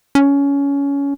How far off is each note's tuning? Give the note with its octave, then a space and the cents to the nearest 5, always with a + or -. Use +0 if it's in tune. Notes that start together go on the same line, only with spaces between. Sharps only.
C#4 +20